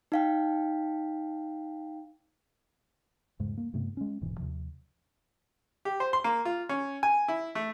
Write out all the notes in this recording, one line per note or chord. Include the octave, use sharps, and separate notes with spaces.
D#4 F5 G5
E2 G#2 C#3 G#3
A#3
G2 C3 A3 B3
G#3 C#4
D#1 G#2 B2 E3
D#2 C3 F3
G4
C5
C6
A#3
F4
C#4
G#5
E4
A3